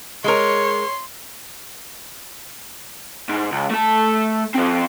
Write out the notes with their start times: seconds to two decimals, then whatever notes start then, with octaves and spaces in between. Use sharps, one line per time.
0.24 G#3 A#4 C#5 C6
3.29 G#2
3.52 C#2
3.71 A3 A5
4.54 F3 C4